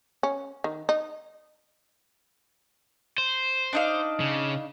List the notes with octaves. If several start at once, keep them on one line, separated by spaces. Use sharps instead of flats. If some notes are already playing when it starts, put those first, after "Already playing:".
C#4
D#3
D#4
C5
D4 D#4 F5
C#3